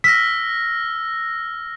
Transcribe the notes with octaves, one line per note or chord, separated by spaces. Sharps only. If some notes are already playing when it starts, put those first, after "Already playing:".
E6 F6 A#6 B6